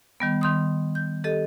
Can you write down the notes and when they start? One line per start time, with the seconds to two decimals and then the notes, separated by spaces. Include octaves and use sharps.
0.20 D#3 G3 B3
0.41 D#3 C6 D#6
0.95 G6
1.24 G4 A4 D#5